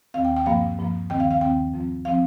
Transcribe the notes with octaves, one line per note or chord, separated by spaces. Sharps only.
D#2 D#3 C4 F5
G5
G5
G2 F3 A#3 F5
G2 F3 A#3
D#2 D#3 C4 G5
F5
F5
D#2 D#3 C4 G5
F2 F3 C4
F3 C4 F5